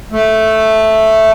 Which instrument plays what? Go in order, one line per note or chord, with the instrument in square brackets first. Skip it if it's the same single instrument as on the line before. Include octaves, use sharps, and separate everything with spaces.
[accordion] A3